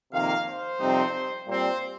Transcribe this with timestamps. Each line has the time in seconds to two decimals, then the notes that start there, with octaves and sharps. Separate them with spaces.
0.12 F2 C3 D#3 A#3 F5
0.46 C5
0.79 F2 C3 G3 C4 D#4
1.46 A#2 G3 C4 C5